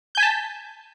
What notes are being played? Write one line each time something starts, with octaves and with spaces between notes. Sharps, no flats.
G#5 A5 G6 B6